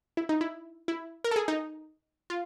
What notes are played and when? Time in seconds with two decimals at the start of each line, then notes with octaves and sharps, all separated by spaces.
0.17 E4
0.29 D#4
0.41 E4
0.88 E4
1.24 A#4
1.31 A4
1.36 G#4
1.48 D#4
2.30 F4